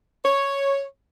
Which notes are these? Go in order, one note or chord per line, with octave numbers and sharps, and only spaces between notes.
C#5